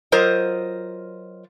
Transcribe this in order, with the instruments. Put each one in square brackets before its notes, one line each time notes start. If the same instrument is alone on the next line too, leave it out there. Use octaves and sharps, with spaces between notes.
[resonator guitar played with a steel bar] F#3 F4 A#4 C5 D#5